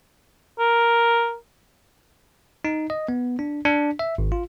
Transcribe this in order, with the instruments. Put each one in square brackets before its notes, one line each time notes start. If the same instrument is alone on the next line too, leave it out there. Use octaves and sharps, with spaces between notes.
[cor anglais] A#4
[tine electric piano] D#4
D#5
B3
D4
D4
E5
G#1
F4